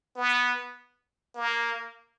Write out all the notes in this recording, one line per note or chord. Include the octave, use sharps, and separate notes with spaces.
B3
A#3